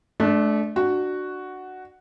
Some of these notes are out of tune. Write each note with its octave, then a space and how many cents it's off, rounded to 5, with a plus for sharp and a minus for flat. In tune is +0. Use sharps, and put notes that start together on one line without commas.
A3 -30 D4 +0
D4 +25 F#4 +0